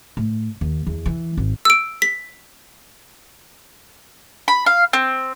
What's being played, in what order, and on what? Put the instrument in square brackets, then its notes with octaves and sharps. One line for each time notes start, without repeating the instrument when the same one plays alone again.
[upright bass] A2
D#2
E2
E3
G#1
[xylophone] E6 D7
B6
[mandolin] B5
F5
C4